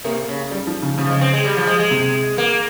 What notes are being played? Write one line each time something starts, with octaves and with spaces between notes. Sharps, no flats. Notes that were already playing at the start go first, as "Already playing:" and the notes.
C3 A#3
C#3
G3
F3
C#3
C#3 F3
G#3
C4
G#3
G3
F3
G#3
G#3
C3
A#3